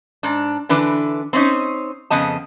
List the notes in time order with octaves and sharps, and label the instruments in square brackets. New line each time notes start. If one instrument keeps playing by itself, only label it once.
[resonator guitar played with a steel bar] G#2 D4
D3 E3 D4 B4
C4 C#4 D#4
F2 C#3 B3 D#5 A5